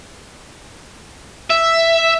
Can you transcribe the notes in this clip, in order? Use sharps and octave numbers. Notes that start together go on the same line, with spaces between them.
E5